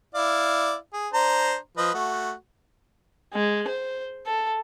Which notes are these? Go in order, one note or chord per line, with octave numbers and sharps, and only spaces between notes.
E4 D5 F5
G#4
D4 C5 A#5
F3 B4 D#5
A3 F#4
G#3
C5
A4